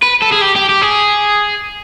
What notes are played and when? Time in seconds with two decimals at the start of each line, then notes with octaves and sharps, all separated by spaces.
0.03 B4
0.22 A4
0.32 G#4
0.42 G4
0.56 G4
0.70 G4
0.82 G#4